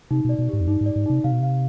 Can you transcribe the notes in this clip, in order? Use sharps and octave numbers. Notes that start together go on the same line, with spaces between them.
C3 D#4
B2 D5
B2
G#2 G4
F2
G2 D#4
G#2
D5
G#2
C3 D#4
C3 F5
B2
C3 F5